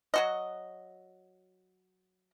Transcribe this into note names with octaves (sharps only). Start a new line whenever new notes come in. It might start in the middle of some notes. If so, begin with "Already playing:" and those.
F#3 F#4 D#5